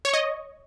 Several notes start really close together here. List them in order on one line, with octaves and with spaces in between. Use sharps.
C#5 C#6 D#5